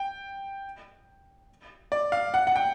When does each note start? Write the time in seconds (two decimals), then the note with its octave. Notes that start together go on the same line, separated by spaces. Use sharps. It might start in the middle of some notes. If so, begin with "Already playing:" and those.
Already playing: G5
1.92 D5
2.12 F5
2.34 F#5
2.47 F#5
2.56 G5